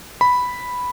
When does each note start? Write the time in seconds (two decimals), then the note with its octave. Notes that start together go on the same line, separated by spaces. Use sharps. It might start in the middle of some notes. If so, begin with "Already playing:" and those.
0.21 B5